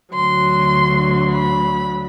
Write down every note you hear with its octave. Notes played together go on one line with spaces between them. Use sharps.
D2 D3 F#3 C6
B5